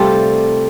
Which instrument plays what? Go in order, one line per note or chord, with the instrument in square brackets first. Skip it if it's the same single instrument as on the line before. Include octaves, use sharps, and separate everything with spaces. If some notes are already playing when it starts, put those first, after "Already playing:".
Already playing: [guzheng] C3 A3 F4 D5 [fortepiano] G3